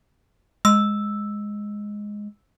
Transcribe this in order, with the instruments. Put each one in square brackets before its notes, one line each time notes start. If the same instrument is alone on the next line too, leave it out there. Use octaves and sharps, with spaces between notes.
[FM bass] G#3 [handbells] E6